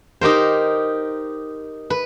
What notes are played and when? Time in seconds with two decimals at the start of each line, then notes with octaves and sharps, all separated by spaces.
0.21 D#4 G4 A#4 C5
1.90 B4